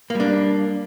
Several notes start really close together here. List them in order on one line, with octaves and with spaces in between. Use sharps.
A#3 G3 D4